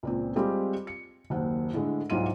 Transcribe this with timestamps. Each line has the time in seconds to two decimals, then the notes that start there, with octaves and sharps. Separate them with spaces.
0.03 C#2 A#2 C4
0.36 G3 G#3 C4 F4 G4
0.87 C#7
1.30 F#1 D#2 F#5
1.73 A2 D3 G#3
2.10 C2 G#2 F#3 F4 D#7